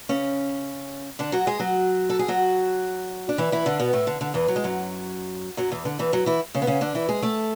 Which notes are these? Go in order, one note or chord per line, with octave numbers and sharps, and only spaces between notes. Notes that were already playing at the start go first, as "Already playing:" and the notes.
C#3 C#4
D3 D4
F#3 F#4
G#3 G#4
F#3 F#4
A4
G#4
F#3 F#4
D4
E3 E4
E3 E4
D3 D4
B2 B3
A2 A3
D3
D3
E2 E3
F#3
G#3
F#2 F#3
F#2 F#3
E2 E3
D3
E2 E3
F#2 F#3
E3 E4
C#3 C#4
B3
C#3 C#4
D3 D4
E3 E4
G#3 G#4
A3 A4